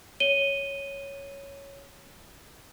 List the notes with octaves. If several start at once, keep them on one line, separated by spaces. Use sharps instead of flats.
C#5 D#7 G7